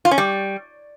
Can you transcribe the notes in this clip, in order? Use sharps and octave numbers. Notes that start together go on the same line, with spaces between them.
F4
C#4
G3